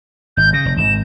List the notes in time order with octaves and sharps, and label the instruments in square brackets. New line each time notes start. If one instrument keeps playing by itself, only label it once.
[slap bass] G#1 [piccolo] G6
[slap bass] C#3 [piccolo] A#6
[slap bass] F1
[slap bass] G#1 [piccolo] E7